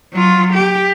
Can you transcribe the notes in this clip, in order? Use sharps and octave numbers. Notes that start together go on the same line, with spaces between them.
F#3 F4
G4